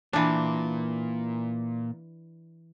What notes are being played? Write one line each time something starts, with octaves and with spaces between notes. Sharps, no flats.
A#2 E3 D4